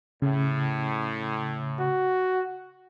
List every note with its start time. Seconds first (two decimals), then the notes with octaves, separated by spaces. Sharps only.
0.22 A2 C#3
1.79 F#4